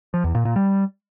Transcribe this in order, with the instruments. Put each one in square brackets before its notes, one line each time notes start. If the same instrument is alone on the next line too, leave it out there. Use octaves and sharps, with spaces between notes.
[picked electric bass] F3
E2
A#2
A#2
G3